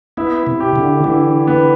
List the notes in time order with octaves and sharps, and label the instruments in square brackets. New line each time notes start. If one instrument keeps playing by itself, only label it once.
[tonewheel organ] B3 [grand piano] E4
[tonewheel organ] C3
[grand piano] G4
[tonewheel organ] D3
[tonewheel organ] D3 [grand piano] E3
[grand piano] B3